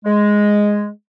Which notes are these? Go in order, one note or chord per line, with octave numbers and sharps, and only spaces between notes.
G#3